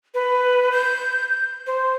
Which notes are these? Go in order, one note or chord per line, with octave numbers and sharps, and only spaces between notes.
B4
G6
C5